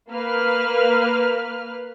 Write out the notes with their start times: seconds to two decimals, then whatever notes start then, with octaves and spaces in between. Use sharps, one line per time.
0.11 A#3 B4 F6